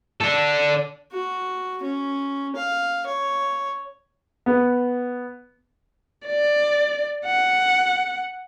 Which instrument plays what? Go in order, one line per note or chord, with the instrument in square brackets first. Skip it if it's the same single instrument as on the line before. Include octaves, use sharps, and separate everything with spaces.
[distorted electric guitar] D4 A4
[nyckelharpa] F#4
C#4
F5
C#5
[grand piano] B3
[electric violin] D5
F#5